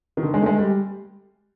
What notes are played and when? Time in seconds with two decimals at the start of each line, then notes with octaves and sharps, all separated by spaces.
0.17 D#3
0.23 D3
0.34 G#3
0.42 A3
0.46 G#3
0.58 G3